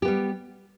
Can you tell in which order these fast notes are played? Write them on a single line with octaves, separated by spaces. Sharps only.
G4 B3 G3